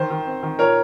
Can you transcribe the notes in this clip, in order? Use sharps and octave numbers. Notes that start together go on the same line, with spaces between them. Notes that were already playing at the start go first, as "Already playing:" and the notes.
Already playing: D#3 C5
D#3
C4
D#3
A#2 A#4 C#5